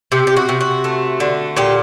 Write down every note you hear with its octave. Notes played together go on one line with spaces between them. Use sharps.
C3 G4
G4
F#4
C3
F#4
A3
D3
A#2 G4